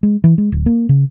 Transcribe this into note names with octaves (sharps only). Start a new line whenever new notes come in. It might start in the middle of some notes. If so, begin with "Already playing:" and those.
G#3
E3
G#3
D1
A#3
C#3